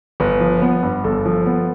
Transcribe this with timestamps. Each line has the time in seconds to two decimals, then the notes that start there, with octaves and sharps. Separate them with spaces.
0.20 G1 B4
0.40 F3
0.62 B3
0.83 G2
1.04 G1 A4
1.26 F3
1.46 B3